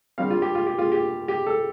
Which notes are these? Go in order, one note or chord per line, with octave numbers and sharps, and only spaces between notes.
D3 G3 C4 F5
F4
G4
F4
G4
F4
G4
G4
A4